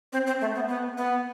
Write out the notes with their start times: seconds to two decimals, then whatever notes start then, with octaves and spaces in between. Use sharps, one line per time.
0.13 C4
0.27 C4
0.41 A3
0.55 B3
0.68 B3
0.97 B3